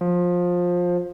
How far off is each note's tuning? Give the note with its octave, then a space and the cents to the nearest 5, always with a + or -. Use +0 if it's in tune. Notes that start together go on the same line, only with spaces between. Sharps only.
F3 +20